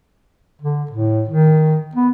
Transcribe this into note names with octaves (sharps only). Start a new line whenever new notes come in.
D3
A2
D#3
B3